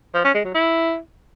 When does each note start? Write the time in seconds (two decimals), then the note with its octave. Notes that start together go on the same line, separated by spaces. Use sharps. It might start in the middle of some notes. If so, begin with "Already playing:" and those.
0.14 F3
0.24 C#4
0.34 G#3
0.44 F#3
0.54 E4